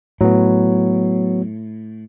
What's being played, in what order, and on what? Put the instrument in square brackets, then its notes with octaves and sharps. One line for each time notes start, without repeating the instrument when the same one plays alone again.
[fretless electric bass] A2 [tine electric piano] F#3 B3